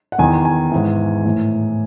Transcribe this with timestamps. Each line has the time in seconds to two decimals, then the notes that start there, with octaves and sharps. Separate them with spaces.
0.12 F#5
0.18 E2 D#3 G#5
0.45 G#5
0.72 G#2 E3
1.25 A2 E3